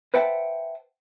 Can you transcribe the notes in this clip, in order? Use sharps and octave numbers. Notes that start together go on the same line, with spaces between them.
B4 C5 E5 F#5 G5 A5